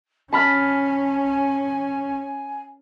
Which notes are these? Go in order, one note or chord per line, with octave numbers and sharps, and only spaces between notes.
C#4 G#5 A5 B5 F6